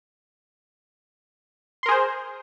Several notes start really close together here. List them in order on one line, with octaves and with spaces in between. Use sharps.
C6 A#4 G#4 C5